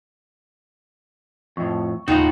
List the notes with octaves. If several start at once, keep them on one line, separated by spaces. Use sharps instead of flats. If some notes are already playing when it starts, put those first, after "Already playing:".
F2 A2 C#6
D#2 A2 C#3 D#4 F4 F#4 G5